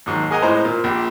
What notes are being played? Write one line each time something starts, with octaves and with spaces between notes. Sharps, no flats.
D#2 G#2 F#3
G#4 A#4 D#5 F#5 G#5 A#5
A2 G#3 C4 B4 C5 A#5
A#2
A#1 G4